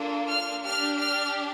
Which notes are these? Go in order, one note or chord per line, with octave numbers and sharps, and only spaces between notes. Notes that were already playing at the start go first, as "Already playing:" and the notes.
Already playing: A#3 D4 F4 A4
F6
D4 G4 F6
F6